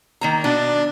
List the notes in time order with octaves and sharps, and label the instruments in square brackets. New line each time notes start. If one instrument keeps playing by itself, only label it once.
[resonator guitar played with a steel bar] D#3 A#3 A#5
[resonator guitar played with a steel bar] B2 [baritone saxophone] D4